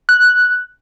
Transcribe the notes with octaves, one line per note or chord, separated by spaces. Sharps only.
F#6